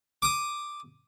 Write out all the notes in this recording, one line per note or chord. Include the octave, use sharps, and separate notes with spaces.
D6 D#6